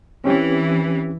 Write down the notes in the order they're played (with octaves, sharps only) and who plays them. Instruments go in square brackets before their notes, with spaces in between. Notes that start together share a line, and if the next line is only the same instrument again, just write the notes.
[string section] E3 [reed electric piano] C4 C#4 G4